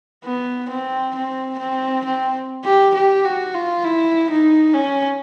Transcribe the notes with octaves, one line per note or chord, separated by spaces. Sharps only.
B3
C4
C4
C4
C4
G4
G4
F#4
F4
E4
D#4
C#4